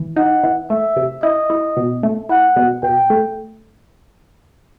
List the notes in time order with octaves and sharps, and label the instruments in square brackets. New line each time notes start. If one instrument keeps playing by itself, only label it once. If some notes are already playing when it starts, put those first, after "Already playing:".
Already playing: [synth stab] E3
[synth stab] D#4 [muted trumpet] F#5
[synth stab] E3
[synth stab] A3 [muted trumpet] E5
[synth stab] C3
[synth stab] E4 [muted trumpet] D#5
[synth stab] E4
B2
A3
[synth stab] E4 [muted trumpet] F#5
[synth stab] B2
[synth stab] B2 [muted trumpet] G5
[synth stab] A3